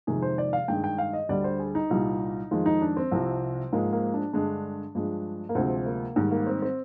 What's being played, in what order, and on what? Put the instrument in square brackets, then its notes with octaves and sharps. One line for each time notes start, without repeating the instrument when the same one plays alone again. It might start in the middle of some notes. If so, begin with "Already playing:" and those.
[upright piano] F2 C3 D#3 G#3 G#4
C5
D5
F5
G2 D#3 G#3 G5
G5
F5
D#5
D2 D3 G3 D5
C5
G#4
D#4
C2 A#2 G3
F2 D#3 G#3 F4
D#4
D4
C4
C2 C3 F3
G#2 F3 G#3 A#3
A#3
D4
G2 D3 G#3 D4
G2 F3 G#3
A#3
D2 C3 F3 G#3 C4
A#3
G#2 D#3 G3
A#3
C4
C4